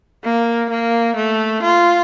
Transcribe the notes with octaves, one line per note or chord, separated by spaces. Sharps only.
A#3
A#3
A3
F4